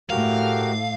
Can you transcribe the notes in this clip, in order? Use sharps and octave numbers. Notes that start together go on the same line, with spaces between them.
A2 A3 F#4 G4 A#4 F5